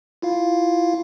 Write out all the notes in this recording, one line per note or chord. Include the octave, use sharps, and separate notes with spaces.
E4 F4 F5